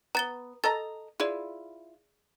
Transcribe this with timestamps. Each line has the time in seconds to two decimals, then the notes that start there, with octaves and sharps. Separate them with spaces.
0.15 B3 A#5 A6 G7
0.64 A4 D#5 A#5 A6
1.20 E4 F4 G#4 D5